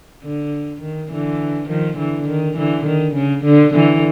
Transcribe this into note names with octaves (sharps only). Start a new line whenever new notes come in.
D3
D#3
D3 E3
D#3 F3
D3 E3
D#3
D3 E3
D#3
C#3
D3
D3 E3